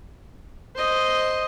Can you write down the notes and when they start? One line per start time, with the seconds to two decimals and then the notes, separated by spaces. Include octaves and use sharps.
0.76 C5 D#5